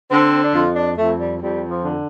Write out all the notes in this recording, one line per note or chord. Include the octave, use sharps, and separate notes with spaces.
D3 C4
D4
F2 F4
D4
F2 A3
G3
F2 G3
F3
D3